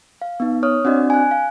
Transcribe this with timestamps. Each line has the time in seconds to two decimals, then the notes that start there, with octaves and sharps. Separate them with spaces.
0.22 F5
0.40 B3 D#4
0.63 C#5 D#6 F6
0.85 C4 D4 F#4 D5 D#5
1.10 G#5 F#6
1.31 F5